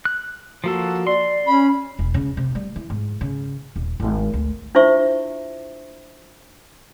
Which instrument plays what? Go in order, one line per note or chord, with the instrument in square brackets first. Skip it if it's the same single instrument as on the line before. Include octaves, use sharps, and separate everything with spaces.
[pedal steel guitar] F#6
[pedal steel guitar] F3 A#3 A4 [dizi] F#4
[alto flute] D5 [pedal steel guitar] C6
[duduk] C#4 [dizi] B5
[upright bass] E1
C#3
C3
G3
E3
G#2
C#3
D#1
G#1
D2
[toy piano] D4 E4 F4 C5 E5 C#6